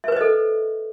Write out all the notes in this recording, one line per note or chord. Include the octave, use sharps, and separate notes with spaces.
A4 B4 C5 D#5 E5